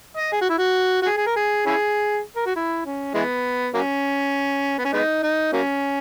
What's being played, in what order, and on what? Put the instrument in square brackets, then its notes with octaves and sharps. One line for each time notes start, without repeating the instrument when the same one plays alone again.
[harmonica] D#5
G#4
F#4
E4
F#4
F#4
G#4
G#4
A#4
G#4
C#4 E4 G#4
A#4
F#4
E4
C#4
E3 G#3 B3
F#3 A#3 C#4
B3
C#4
G#3 B3 D#4
D#4
F#3 A#3 C#4